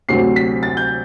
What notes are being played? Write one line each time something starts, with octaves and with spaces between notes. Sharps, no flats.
D2 C3 F#3 C4 C7
B6
A6
G6